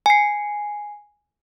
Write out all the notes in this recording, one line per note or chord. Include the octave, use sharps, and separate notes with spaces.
G#5 C7